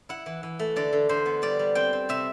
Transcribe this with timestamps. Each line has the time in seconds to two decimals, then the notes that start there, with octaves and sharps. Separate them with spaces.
0.09 E4 F#5
0.26 E3
0.43 E3
0.59 A3
0.76 D3 D5
0.93 D3
1.09 D3 C5
1.26 B3
1.42 G3 D5
1.59 G3
1.75 C4 G5
1.93 C4
2.09 C3 E5